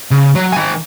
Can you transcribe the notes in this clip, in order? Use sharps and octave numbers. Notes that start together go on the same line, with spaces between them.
C#3
F#3
D#3 G#5